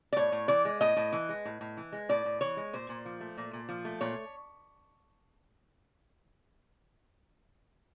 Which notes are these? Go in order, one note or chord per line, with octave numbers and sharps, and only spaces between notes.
D5
A2 C#5
A2
E3 D5
G#3
A2 D#5
A2
E3
G#3
A2
A2
E3
G#3
A2 D5
A2
E3 C#5
G#3
A#2 C5
A#2
F3
A3
A#2
A#2
F3
A3
A#2 C#5